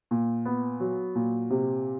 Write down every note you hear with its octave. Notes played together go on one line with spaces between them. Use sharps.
A#2
B3
F#3
A#2
C3